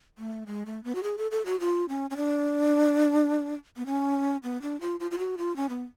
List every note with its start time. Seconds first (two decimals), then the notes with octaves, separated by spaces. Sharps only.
0.18 A3
0.47 G#3
0.66 A3
0.84 B3
0.95 F#4
1.03 G#4
1.18 A4
1.31 A4
1.46 F#4
1.60 F4
1.89 C#4
2.10 C#4
2.17 D4
3.77 B3
3.86 C#4
4.43 B3
4.62 D4
4.81 F4
5.00 F4
5.11 F4
5.18 F#4
5.38 F4
5.56 C#4
5.69 B3